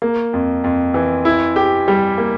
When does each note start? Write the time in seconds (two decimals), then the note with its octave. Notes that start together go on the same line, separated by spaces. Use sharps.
0.02 A#3
0.34 F2
0.64 F2
0.94 E3
1.25 E4
1.56 G4
1.88 G3
2.18 A#3